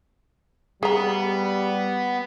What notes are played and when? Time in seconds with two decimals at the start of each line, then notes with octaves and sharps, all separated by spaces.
0.83 G3 B3 G#4 A#5